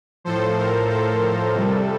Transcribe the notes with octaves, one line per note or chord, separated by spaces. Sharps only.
A2 F3 A4 C5
A#4
A4
F2 C3 G3